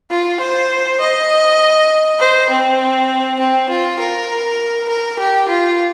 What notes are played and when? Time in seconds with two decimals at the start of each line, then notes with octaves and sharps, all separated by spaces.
0.10 F4
0.40 C5
1.00 D#5
2.19 C5
2.50 C4
3.40 C4
3.70 F4
3.99 A#4
4.89 A#4
5.19 G4
5.48 F4